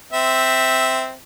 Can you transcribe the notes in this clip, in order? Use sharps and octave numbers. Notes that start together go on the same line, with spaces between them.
C4 E5